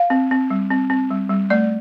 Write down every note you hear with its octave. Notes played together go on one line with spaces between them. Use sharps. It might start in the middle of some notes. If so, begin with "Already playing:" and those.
Already playing: F5
C4
C4
G3
C4
C4
G3
G3
A3 D5